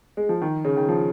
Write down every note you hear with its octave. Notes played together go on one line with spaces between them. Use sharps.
G#3
F3
D#3
C#3
D#3
F3